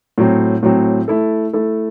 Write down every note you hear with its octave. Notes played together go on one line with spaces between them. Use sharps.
A2 F#3 C4
A2 F#3 C4
A3 E4 A4
A3 E4 A4